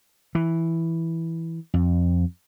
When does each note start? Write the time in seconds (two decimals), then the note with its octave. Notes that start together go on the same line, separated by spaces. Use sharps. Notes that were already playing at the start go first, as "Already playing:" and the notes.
0.35 E3
1.74 F2